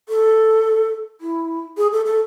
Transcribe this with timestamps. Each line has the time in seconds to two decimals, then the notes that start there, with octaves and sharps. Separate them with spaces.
0.09 A4
1.21 E4
1.77 G#4
1.92 A4
2.06 A4